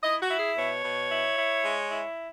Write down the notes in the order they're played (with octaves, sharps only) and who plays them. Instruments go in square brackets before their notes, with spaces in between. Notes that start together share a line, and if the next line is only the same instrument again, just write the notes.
[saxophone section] E4 D#5
F#4
E4
G#4
B2 C#5
B2
E4
E4
G#3
E4